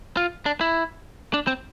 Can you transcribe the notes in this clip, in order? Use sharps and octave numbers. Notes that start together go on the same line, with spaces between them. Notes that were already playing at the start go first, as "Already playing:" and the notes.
F4
D4
E4
D4
C4